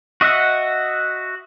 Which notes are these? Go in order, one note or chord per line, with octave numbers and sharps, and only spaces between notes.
F#4 D#5 E5 F#5